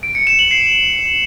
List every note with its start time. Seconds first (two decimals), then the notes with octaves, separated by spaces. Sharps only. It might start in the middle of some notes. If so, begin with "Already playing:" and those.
0.03 D7
0.15 C#7
0.27 E7
0.39 F#7
0.51 C7